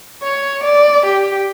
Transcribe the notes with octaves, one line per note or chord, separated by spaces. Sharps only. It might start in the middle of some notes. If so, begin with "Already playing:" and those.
C#5
D5
G4